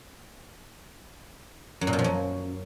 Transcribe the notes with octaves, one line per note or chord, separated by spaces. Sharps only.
F#2
A#2
B2
F3
F#2